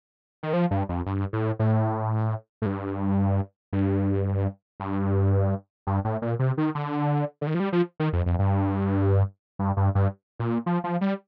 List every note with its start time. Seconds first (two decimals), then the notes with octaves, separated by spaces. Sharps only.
0.43 D#3
0.53 F3
0.71 G2
0.89 F2
1.06 G2
1.33 A2
1.59 A2
2.62 A2
2.66 G2
3.73 G2
4.80 G2
5.87 G2
6.05 A2
6.22 A#2
6.39 C3
6.58 D#3
6.75 D3
7.41 D3
7.47 D#3
7.54 F3
7.60 G3
7.73 F3
8.00 D#3
8.13 F2
8.26 F2
8.39 G2
9.59 G2
9.77 G2
9.95 G2
10.39 A#2
10.66 F3
10.84 F3
11.01 G3